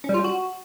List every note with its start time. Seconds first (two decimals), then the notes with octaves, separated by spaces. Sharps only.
0.04 C#4
0.09 G3
0.14 F4
0.19 G3
0.24 F#4